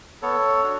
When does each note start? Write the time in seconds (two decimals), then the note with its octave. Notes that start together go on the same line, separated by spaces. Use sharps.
0.22 B3 A4 C#5
0.63 D4 F#4